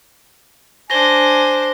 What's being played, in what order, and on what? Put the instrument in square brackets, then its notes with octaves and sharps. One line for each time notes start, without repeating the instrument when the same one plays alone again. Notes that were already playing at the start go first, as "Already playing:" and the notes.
[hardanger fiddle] D4 C5 [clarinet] G#5 [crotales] A#6 G7